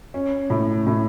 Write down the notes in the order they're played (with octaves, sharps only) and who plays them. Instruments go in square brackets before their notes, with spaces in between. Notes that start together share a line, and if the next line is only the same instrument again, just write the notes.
[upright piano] C#4
A2
A2